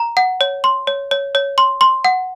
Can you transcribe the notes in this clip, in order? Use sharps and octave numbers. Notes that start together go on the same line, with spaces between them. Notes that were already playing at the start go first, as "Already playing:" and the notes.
Already playing: A#5
F#5
C#5
C6
C#5
C#5
C#5
C6
C6
F#5